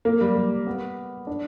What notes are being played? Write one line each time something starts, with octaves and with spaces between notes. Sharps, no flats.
A#3
G3
G3
B3
D4